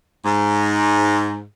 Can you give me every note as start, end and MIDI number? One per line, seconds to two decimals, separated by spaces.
0.25 1.44 44